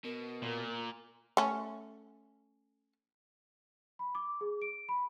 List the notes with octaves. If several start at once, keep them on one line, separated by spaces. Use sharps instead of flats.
B2 A#4
A#2
A3 C#4
B5
D6
G#4
D7
B5